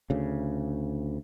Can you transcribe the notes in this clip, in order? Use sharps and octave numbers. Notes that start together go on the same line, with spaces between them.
D2 C#3